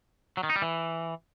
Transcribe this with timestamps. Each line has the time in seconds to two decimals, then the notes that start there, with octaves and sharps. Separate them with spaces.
0.37 F#3
0.43 D#3
0.50 D#4
0.56 G3
0.62 E3